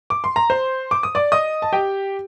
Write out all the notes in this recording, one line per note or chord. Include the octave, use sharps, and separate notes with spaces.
D6
C6
A#5
C5 C6
D6
D#6
D5 D6
D#5 D#6
A5
G4 G5